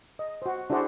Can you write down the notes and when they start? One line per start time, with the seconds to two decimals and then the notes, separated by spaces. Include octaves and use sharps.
0.19 D#5
0.42 F#4 C5
0.70 D4 E4 F#4 G#4 C5 D5